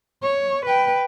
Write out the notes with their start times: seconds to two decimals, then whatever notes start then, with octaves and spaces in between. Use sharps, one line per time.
0.23 C#5
0.66 B4 G5